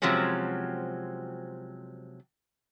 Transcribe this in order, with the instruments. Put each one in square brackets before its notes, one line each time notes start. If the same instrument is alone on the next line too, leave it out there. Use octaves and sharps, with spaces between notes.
[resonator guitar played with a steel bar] C3 F3 F#3 G#3 C4 C#4